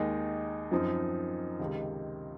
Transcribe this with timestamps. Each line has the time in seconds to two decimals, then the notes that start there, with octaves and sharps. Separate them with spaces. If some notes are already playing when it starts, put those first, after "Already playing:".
Already playing: D#2 D#3 G#3 D#4
0.71 F#2 F3 C4 D#4
1.59 C#2 C3 D#3